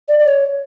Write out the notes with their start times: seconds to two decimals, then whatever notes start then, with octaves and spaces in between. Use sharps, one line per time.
0.08 D5
0.19 D5
0.26 C#5